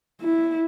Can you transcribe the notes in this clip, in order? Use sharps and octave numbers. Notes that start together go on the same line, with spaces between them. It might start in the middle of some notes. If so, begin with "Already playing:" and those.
E4